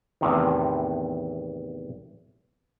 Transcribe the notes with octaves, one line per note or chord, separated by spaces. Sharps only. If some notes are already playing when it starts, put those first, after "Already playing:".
E2 A2 C3 D#3